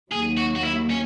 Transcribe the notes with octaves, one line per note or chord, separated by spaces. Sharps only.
D#2 D#3 F#3 A#3 G#4
F#4
F#4
E4
C#4